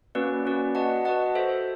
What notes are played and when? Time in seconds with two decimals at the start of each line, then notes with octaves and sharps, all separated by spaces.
0.15 A#3 C#4 F#4 B4 D5
0.45 A#3 C#4 F#4 B4 D5
0.75 F#4 B4 D#5 F#5 A5
1.05 F#4 B4 D#5 F#5 A5
1.35 F#4 A4 C5 E5